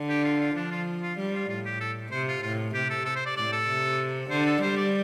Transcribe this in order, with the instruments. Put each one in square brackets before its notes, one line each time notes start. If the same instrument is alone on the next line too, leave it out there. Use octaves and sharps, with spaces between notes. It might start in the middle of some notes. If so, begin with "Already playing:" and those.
Already playing: [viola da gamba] D3
[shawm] G4
F4
F4
[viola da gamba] F3 [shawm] D4
[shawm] F4
F4
[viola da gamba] G3
[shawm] F4
[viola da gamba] A2 [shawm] F4
[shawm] G4
A4
[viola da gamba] C3 [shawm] C5
[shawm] F4
[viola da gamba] A2 [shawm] F4
[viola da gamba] C3 [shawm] G4
[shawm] A4
A4
C5
D5
[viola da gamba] A2 [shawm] D5
[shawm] A4
[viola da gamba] C3
[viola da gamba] D3 [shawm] C5
[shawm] A4
[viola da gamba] G3 [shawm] C5
[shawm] D5